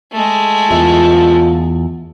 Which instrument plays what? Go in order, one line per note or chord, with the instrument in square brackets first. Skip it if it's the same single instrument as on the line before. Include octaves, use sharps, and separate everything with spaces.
[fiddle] G#3 A3
[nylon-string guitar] E2 B3 E5 [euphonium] F4